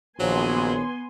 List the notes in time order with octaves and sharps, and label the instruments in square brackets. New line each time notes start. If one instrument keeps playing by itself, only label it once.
[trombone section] A#1 [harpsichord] D#3 F3 C#4 [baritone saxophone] F#3 [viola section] B3 G#5 C6